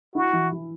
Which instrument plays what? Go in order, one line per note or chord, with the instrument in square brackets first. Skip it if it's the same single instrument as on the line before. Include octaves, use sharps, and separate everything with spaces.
[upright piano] E4 [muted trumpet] F#4
[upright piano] E3
E3